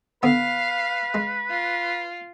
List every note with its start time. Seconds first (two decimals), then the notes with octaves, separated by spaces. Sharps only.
0.23 D3 B3 B4 F5
1.14 G#3
1.50 F4